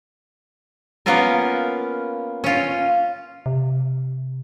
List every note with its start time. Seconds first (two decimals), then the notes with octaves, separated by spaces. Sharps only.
1.06 A#3 B3 C#4 F4 A#4
2.44 C#4 F4
3.46 C3